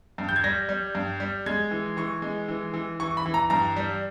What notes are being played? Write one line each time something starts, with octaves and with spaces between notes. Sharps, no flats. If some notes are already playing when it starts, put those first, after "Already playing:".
G2
G6
G#6
G3 A#6
G3
G2
G3
G#3 G#6
E3
E3 C#6
G#3
E3
E3
E3 C#6
B5
E3
A#5
G2 A#5
G3